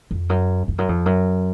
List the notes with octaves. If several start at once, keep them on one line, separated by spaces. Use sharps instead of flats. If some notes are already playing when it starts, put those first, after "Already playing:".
F2
F#2
F2
F#2
F2
F#2